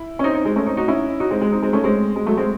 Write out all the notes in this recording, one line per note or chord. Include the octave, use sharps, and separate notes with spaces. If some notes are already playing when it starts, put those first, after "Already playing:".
Already playing: E4
C#4
C4 D#4
C4 D#4
G#3 C4
A3 C#4
C4 D#4
D#4 F#4
C#4 E4
D#4 F#4
G#3 C4
G#3
C4 D#4
G#3 C4
A3 C#4
G#3 C4
G#3
F#3 A3
G#3 C4